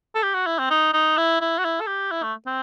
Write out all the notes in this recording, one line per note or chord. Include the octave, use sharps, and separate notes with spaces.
A4
G4
F#4
E4
C4
D#4
D#4
E4
E4
F#4
E4
A4
G4
E4
A3
C4